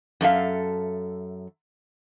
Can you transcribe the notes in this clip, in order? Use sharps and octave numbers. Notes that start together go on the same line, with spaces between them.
F#2 A4 E5 F5